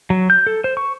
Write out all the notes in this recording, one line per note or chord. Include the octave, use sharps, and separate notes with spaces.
F#3
G6
A4
C5
C#6